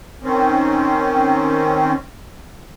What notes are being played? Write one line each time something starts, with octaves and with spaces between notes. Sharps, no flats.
D#3 C4 C#4